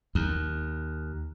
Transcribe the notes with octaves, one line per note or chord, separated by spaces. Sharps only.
D#2